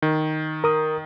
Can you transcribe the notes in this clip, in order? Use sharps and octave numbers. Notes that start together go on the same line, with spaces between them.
D#3
A#4 D#6